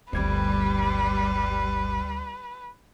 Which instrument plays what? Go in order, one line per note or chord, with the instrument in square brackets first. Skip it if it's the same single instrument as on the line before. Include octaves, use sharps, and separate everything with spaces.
[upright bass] G1 C4 [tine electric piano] D2 G#6 [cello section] G3 [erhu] B4